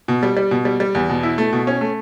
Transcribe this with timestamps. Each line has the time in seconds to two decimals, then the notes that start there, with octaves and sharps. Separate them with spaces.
0.08 B2
0.23 G3
0.37 G3
0.51 B2
0.65 G3
0.80 G3
0.95 E2
1.09 B2
1.23 E4
1.38 A3
1.53 B2
1.67 C#4
1.81 A3